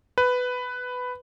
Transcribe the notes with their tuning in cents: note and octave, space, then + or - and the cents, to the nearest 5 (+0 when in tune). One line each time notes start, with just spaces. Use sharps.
B4 +10